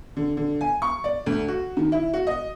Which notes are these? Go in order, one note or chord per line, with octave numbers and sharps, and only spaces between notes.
D3
D3
G#5
C#6
D5
D2
F#4
D#3
E4
F#4
D#5